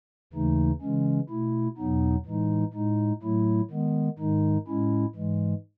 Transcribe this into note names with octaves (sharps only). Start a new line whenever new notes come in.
D#2 C#3 E3 A3 D#4
C#3 E3 G#3 C#4
B2 A3 E4
E2 B2 F#3 B3 D#4
A2 E3 G#3 D#4
A2 G#3 D#4
A2 F#3 A3 E4
D#3 G#3 B3
G#2 D#3 G#3 D#4
A2 G#3 C#4 E4
G#2 E3 G#3